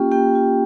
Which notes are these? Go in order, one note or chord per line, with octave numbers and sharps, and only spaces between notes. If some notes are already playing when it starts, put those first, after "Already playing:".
Already playing: A#3 C#4 F4 G4 G5
A#3 G4 G5
F4